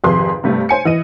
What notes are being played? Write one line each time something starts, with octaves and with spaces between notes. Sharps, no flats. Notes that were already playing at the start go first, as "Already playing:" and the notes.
G#1 F2 C3 G#4 B4 C6
G2 C3 A3 B3
C5 G#5 C#7
E3 D#5 D#7